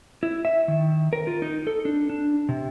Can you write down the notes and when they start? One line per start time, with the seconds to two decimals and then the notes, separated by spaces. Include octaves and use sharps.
0.23 E4
0.45 E5
0.68 D#3
1.13 A#4
1.27 F4
1.42 D#4
1.67 A4
1.85 D4
2.10 D4
2.49 C3